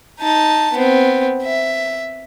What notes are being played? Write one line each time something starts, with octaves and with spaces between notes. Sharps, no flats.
D#4 A5
B3 C4
E5